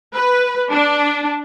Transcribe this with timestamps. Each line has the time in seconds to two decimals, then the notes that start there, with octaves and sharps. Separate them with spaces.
0.14 B4
0.71 D4